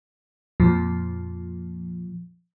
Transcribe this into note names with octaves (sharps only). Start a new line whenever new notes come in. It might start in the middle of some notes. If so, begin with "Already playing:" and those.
F2 A#2 F3